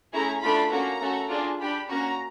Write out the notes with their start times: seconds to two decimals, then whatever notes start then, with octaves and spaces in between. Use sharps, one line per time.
0.13 A3 C#4 E4 G#4 A#5
0.43 A3 D4 F4 B5
0.71 A#3 C#4 F#4 A4 A#5
1.01 A3 C#4 F#4 A4
1.30 D4 F4 G#4
1.60 D4 G4 B5
1.89 A#3 C#4 F#4 A#5